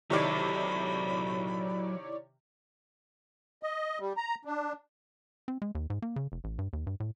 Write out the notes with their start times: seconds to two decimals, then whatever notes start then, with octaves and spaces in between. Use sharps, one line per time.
0.10 C3 D#3 F#3 E4 A4 C#5 D5 B5
3.63 D#5
4.00 G3
4.17 A#5
4.45 D4
5.48 C4
5.62 G#3
5.75 D#2
5.90 G#2
6.02 A#3
6.16 C#3
6.32 F1
6.44 A1
6.59 G2
6.73 D#2
6.87 G2
7.00 A2